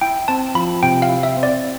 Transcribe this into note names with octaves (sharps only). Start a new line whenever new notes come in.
E4 G5
C4 A5
F3 B5
C3 G5
F5
E4
E5
C4
D5